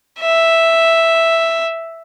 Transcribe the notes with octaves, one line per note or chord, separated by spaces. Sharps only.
E5